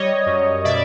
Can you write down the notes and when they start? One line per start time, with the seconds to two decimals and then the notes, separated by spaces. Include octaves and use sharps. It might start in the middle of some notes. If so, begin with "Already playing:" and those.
Already playing: G3 C#5 D#5
0.26 F#2
0.64 B2 D5 E5